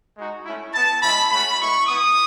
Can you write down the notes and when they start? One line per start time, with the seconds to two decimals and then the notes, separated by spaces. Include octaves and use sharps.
0.16 G#3 D#4 F#4
0.45 A3 C#4 E4
0.73 B3 E4 A5
1.01 G#3 C#4 E4 B5
1.30 A3 C#4 F#4 B5
1.59 G#3 B3 E4 C#6
1.87 B3 E4 D#6